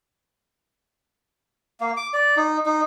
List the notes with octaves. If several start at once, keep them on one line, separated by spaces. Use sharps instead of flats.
A#3
D6
D5
D#4
D#4